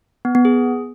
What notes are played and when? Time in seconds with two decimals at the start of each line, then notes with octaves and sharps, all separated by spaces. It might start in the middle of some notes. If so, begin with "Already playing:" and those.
0.25 B3
0.35 B3
0.45 G#4